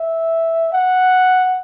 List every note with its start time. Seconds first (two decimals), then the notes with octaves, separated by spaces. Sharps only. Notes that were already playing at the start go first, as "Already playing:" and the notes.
Already playing: E5
0.72 F#5